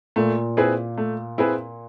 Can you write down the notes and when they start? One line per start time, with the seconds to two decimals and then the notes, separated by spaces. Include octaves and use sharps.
0.16 A#2 A3
0.57 C4 E4 G#4 B4
0.98 A3
1.38 C4 E4 G#4 B4